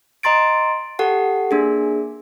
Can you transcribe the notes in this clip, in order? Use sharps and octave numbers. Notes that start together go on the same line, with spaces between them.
D#5 A#5 C6 A6 D7
G4 A4 F#5
A#3 D4 G#4